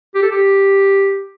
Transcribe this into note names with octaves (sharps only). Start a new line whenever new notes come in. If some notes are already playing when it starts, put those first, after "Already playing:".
G4
A4
G4